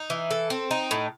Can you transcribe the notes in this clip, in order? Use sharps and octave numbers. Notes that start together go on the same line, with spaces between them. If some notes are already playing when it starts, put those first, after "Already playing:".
Already playing: D#4
E3
A4
C4
D#4
A2